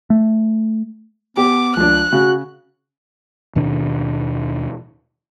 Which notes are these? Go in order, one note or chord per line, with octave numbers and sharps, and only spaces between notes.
A3
B3 G4 D6
C#2 F3 D4 F#6
C#3 F#4
D#2 B2 D#3 D4